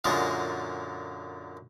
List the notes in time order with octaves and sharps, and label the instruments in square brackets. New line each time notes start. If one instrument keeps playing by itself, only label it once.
[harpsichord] F#2 A#2 D3 G#3 G#4